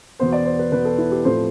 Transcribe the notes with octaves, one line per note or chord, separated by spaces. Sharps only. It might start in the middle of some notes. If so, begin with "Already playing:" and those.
E2 B2 B3 C5
D5
C5
B4
E2 B2 B3 B4
A4
E4
G4
A2 F3 A3 C4 C5